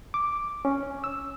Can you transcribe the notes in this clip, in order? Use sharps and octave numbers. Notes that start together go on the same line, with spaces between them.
D6
C#4
E6